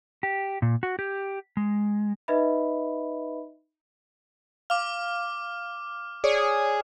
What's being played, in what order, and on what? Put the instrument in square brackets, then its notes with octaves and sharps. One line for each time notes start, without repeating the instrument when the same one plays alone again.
[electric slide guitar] G4
A#2
F#4
G4
G#3
[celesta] D#4 B4 D#5 E5 B5
[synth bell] F5 [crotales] D6 F6
[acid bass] G#4 [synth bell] C#5 D5